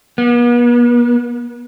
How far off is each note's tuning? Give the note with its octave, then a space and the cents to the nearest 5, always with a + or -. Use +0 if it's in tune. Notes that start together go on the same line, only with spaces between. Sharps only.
B3 -45